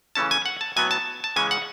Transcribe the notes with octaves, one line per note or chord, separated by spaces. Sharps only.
C#3 E3 A3 C#4 A5
G#5
F#5
A5
A2 F#3 B3 G#5
A5
A5
C#3 E3 G#3 C#4 G#5
F#5